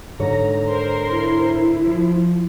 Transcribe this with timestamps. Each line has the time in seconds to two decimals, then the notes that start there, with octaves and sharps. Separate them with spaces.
0.19 G#2 D3 C#5 A#5
0.68 A#4 C5 C6
1.11 E4
1.85 F3 C5